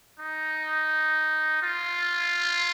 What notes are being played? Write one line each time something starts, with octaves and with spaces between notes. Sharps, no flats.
D#4
F4